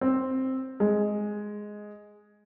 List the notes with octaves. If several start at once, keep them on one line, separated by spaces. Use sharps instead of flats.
C4
G#3